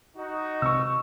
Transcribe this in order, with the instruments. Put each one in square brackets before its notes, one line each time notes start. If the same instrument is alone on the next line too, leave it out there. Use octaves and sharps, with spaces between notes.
[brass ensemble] D#4 F#4
[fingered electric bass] C3 G#3 C4 [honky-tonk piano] C#6 E6